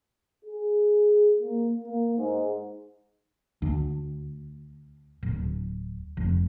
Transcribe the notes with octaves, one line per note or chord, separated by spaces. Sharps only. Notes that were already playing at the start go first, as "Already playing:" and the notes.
G#4
A#3
A#3
G#2
D2
D1
F1